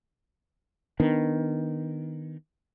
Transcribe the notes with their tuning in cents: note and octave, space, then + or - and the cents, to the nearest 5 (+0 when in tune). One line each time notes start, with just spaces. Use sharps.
D#3 +0 B3 +0 D4 +0